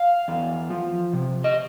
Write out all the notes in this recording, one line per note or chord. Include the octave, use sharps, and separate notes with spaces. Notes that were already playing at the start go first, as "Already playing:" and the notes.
Already playing: F5
E2
F3
C3
D#5